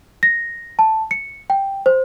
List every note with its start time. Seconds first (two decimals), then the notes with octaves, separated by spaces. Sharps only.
0.23 A#6
0.79 A5
1.11 C#7
1.50 G5
1.86 C5